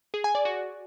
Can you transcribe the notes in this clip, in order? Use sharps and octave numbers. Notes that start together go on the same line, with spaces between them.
G#4
G#5
D5
F#4